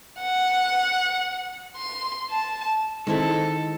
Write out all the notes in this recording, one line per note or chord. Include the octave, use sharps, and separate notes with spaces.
F#5
C6
A5
D#3 G#3 C4 E4 A4